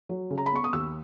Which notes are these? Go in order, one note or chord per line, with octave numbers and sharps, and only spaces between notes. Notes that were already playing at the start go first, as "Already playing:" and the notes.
F#3
C#3
A#5
B5
B3 C#6
D#6
D#2 E6